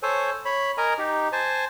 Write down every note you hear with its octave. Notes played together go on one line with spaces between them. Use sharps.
A4 C5 C#5 G#5
C#5 B5
A#4 D#5 G#5 A#5
D#4 G4
C5 G#5 A5